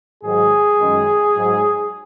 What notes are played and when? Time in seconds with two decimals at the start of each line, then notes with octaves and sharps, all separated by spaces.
0.23 G#2 D#3 F#3 G#4
0.78 F#2 D#3 G#3
1.34 G#2 F#3